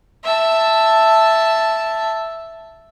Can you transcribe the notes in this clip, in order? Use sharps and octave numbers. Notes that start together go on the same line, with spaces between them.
E5 A5